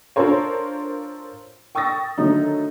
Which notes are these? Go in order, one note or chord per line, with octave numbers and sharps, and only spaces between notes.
D4 F4 A4 A#4 C5 C#5
G5 C#6 D#6 E6 A6 A#6
D3 D#3 F#3 A3 D#4